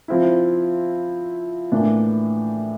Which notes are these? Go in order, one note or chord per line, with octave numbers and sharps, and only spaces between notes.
F3 C4 E4
A2 E3 A#3 D4